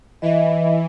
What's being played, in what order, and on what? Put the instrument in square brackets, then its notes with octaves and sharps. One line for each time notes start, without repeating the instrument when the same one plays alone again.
[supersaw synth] E3 [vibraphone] D#5 E5